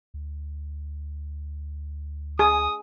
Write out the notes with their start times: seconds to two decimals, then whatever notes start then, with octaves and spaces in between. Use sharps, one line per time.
0.14 D2
2.39 G#4 D#6